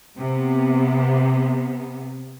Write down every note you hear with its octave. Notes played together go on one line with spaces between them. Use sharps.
C3 B3